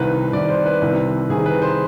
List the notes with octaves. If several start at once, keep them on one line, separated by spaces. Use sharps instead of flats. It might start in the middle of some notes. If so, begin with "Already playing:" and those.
Already playing: C2 C3 D#3 B4
C2 C3 D#3 D5
C5
B4
C2 C3 D#3 B4
C2 C3 D#3 G#4
B4
C5